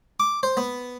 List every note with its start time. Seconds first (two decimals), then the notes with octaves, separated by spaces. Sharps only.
0.20 D6
0.43 C5
0.57 B3